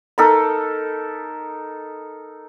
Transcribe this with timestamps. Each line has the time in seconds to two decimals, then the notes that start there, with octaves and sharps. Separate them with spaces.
0.18 D#4 A4 A#4 B5